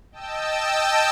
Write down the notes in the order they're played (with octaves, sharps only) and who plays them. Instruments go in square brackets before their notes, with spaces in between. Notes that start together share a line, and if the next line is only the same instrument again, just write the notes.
[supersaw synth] D#5 G5 A5 E6